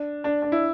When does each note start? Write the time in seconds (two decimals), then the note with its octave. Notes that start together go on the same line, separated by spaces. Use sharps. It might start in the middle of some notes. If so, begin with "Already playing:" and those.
Already playing: D4
0.24 D4
0.42 D4
0.52 E4